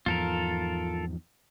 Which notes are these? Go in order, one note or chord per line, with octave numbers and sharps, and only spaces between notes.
E2 G#2 F3 F4 A4 A#4